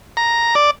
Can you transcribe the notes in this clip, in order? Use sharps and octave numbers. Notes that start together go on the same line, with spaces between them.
A#5
D5